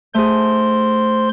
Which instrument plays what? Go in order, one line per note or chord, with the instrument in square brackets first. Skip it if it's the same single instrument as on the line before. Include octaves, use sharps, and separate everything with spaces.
[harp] A3 G#4 [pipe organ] C5 C6